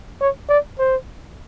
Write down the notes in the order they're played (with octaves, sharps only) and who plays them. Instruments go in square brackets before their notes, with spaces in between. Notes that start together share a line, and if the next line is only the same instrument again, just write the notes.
[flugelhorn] C#5
D5
C5